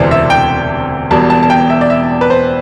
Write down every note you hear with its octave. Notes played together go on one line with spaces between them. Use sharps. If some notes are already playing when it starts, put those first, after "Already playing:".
Already playing: E1 D2 C3 E3 C5 D5
E5
G5
E1 E2 B2 G3 A5
A5
A5
G5
E5
D5
E5
B4
C5